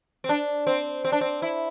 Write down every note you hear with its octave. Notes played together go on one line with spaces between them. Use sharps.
C4
D4
C4
C4
D4
C4
E4